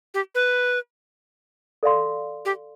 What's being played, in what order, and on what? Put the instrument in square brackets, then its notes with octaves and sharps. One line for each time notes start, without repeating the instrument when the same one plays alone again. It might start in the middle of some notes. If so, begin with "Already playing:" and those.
[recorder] G4
B4
[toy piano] A4 D5 F5 C6
[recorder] G4